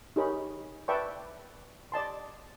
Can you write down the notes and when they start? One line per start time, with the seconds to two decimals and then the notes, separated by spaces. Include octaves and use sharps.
0.16 D#4 G4 G#4 A#4 C#5 B5
0.88 B4 D5 E5 G5 A5 C#6
1.92 D5 D#5 A5 C6